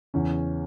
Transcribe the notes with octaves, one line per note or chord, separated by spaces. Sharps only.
E2 C#3 E3 C#4